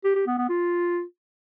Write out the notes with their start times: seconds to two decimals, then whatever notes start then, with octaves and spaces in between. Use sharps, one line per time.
0.04 G4
0.15 G4
0.27 B3
0.38 B3
0.49 F4